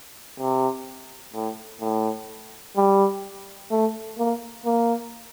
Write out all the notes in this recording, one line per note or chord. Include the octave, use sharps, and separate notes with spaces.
C3
A2
A2
G3
A3
A#3
A#3